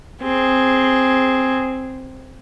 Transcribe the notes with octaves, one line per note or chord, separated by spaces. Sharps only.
C4 G#4